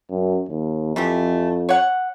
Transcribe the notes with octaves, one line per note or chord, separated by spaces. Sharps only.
F#2
D#2
F2 E3 A3 G4
C#5 F#5